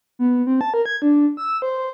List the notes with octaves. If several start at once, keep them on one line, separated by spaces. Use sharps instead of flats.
B3
C4
A5
A#4
G#6
D4
E6
C5